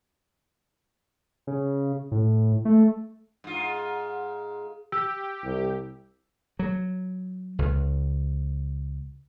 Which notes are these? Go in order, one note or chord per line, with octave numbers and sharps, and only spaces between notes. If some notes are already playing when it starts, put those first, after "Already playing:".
C#3
A2
A3
G#2 F4
G4 E6
C2
F#3
C#2